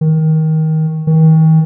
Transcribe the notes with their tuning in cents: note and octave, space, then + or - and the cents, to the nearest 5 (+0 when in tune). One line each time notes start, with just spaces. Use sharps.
D#3 +20
D#3 +40